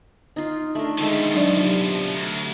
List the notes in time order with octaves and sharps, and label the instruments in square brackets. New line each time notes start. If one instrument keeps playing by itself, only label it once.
[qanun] D#4 F4
[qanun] A3 A#4 [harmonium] D4
[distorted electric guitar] B2 F3 [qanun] D#3 A4 [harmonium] G#3 E5
[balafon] F#3 D4 D5
[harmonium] C3 [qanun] F4
[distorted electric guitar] D2